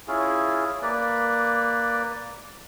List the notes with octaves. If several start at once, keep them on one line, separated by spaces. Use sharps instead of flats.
C#4 E4 F4 G#4
A#3 B4 D5